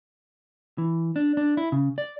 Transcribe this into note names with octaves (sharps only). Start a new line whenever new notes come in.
E3
D4
D4
E4
C#3
D5